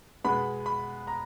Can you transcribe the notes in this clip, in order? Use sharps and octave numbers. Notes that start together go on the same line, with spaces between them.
B2 G#3 B3 B5
B5
A#5